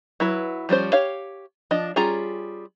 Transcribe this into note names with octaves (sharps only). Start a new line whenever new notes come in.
F#3 E4 B4
F3 G3 C#4 C5
G4 C#5 F5
F3 D4 D#5
G3 C#4 F4 G#4 A#5